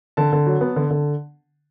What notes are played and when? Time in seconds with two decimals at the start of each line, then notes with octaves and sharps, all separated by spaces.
0.17 D3 A5
0.33 D3
0.46 F#3
0.61 B3
0.76 D3
0.91 D3